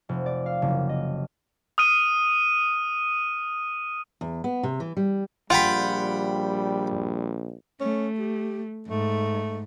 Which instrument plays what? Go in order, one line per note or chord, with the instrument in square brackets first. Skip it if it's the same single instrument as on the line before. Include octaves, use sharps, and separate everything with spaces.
[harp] F1
D5
F5
F#1
D#5
[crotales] D#6 F6 D#7
[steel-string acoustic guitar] E2
B3
C3
E3
G3
[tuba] A#1 [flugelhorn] G3 [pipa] F4 [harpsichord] F#5 G5 B5
[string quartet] A3 [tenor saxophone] C#4
[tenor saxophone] G4
[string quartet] G#2 [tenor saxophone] A3